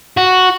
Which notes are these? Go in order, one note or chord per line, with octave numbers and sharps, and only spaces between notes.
F#4